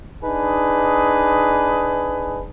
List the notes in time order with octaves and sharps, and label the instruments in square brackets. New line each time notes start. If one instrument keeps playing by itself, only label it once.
[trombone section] D4 D#4 G#4 B4